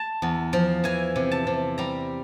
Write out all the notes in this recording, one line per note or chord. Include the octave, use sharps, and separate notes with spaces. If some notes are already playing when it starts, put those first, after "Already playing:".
Already playing: A5
E2
F3
E3 G#5
C3
A5
C3
G3 A#5